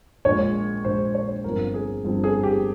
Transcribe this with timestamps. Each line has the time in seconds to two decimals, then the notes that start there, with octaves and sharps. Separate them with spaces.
0.25 A#1 A#2 G#3 C#5
0.85 A#1 A#2 G#3 C5
1.14 C#5
1.44 G1 G2 F3 C4 A#4
1.74 G#4
2.04 G1 G2 F3 C4
2.24 G#4
2.43 G4